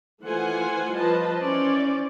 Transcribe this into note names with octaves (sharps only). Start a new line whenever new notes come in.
E3 A3 F4 C5 F#5 G#5
F3 G3 B4 C5 D#5 A5
E3 C#4 C5 D5